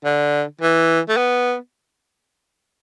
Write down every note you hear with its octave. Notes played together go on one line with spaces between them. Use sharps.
D3
E3
A3
B3